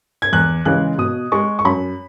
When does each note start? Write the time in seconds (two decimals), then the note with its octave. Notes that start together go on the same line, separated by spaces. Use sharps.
0.22 G#6
0.33 E2 F#6
0.65 C#3 E3 G#3 F#6
0.98 B2 D#6
1.32 G#3 C#6
1.59 C#6
1.64 F#2 B5